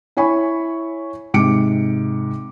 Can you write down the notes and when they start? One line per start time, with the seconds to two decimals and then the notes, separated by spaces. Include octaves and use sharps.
0.17 E4 C#5 G#5 B5 C#6
1.34 G#2 C3 D6 C#7 D7